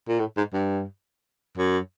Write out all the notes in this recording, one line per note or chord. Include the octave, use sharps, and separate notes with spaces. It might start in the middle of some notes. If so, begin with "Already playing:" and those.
A#2
A2
G#2
G2
F#2